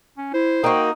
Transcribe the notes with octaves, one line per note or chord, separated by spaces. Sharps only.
C#4
E4 C5
A#3 D#4 F#4 G5